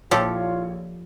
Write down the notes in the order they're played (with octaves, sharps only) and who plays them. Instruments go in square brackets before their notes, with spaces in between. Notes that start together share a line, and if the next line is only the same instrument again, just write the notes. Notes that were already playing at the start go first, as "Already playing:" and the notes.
[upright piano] A#1 C#5 [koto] F3 G4 A4 [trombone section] E4 F4